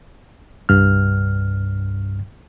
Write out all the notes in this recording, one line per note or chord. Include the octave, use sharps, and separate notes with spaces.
C2 G2 F6